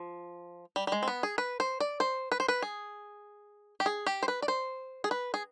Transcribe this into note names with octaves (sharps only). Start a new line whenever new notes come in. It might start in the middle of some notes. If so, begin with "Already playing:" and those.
Already playing: F3
G3
G3
G#3
C4
B3
G#4
B4
C5
D5
C5
B4
C5
B4
G#4
G4
G#4
G4
C5
B4
D5
C5
G#4
B4
G#4